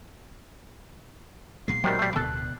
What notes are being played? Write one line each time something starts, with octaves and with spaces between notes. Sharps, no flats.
B1 A#2 G#3 C7
C3 D#3 F#3 G3
G3 A3
D1 B2 D3 B3 A4 F#6